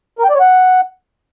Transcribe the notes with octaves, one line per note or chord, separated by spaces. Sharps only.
A#4
G5
D5
C#5
F#5